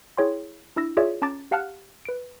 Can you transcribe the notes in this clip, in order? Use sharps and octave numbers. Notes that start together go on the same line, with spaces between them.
E4 G#4 C#5 G5 C6
D4 E4 E6 A#6
F4 G#4 C#5 D5 E5
C#4 A5 A#5 D6 A6
G4 F5 F#5 A5 F6 F#6
B4 D7